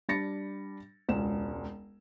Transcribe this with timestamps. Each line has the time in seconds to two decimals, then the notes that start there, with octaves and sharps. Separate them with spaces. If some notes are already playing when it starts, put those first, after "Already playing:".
0.09 G3 D4 B5 A6 A#6 C#7
1.09 E1 C#2 E7